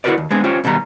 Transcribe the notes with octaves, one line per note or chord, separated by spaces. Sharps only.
E4 F#4 G#4 A#4 B4 D5
D#2
G#3 B3 C4 D4 G#4
C#4 F4 G4 C5 C#5
B1 B2 D#3 G3 A#5